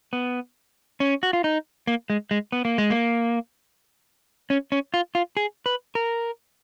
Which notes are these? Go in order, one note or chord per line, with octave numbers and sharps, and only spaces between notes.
B3
C#4
F#4
F4
D#4
A#3
G#3
G#3
B3
A#3
G#3
A#3
C#4
C#4
F4
F4
G#4
B4
A#4